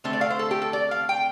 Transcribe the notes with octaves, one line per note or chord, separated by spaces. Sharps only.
D3 A3 C4 C5
D5
F5
C5
A4
G4
A4
D5
F5
G5